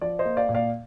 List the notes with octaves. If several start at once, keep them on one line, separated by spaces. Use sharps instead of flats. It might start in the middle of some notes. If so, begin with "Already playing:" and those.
F3 D5
C5 D#5
A#3
D5 F5
A#2
D5 F5